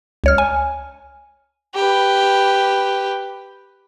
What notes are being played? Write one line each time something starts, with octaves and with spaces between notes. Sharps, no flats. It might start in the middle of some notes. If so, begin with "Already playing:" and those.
C#2 C#5 F6
G#5
G4 B4